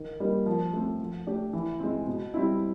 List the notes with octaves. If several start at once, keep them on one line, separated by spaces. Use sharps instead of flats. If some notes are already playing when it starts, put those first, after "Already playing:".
Already playing: D#3
G3 A#3 D#4
F3
A3 C4
F3
A3 D4 G4
E3
G#3 C4
B2
G3 C4 E4